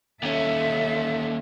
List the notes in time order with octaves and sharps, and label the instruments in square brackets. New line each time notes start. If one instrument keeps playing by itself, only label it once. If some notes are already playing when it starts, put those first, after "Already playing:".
[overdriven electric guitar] D#2 C#4 [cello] A4 E5